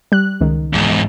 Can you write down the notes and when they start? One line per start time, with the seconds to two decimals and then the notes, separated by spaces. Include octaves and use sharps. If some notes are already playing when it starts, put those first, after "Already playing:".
0.12 G3 F#6
0.41 C#2 D#3
0.73 E2 G#2